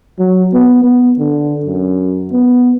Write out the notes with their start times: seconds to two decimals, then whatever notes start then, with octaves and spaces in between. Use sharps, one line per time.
0.19 F#3
0.53 B3
0.84 B3
1.19 D3
1.66 F#2
2.32 B3